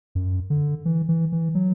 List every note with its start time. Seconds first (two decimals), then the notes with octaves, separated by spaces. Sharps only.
0.15 F#2
0.50 D3
0.85 E3
1.09 E3
1.32 E3
1.55 F#3